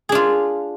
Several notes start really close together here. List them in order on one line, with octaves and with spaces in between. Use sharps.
G#4 D4 F4